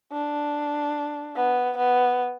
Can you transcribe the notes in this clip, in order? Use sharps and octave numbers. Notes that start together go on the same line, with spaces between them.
D4
B3
B3